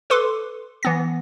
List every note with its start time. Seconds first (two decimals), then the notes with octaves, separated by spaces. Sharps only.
0.10 A4 B4 C6 D6
0.83 E3 B3 A#6